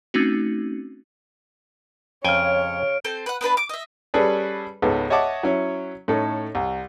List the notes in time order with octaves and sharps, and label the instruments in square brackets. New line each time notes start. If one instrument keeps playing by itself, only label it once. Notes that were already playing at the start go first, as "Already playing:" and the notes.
[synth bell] A3 C4 C#4 D#4 F#4
[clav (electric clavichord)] F2 G5 G#5 [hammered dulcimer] C#3 C#4 [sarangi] C#5 [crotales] F6 D7
[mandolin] C4 A4 C5
B4 F#5
B3 D4 B4 A5
D6
D#5 E5
[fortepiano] G3 C#4 G#4 A4 B4 D5
C#2 G#2 B3 A4
C#5 D#5 E5 F#5 A5 D6
F#3 C#4 E4
A2 C#4 D#4 A4
C2